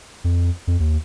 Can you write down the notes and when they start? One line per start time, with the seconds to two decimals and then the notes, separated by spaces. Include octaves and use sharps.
0.24 F2
0.67 F2
0.80 D#2